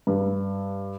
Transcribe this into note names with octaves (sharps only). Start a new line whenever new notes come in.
G2